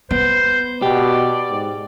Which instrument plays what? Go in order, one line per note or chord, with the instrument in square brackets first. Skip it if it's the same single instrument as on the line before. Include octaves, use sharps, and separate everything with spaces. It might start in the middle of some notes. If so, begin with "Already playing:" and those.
[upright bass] B3 [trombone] B4 [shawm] C5
[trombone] B2 [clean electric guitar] G4 [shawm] D5
[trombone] G#2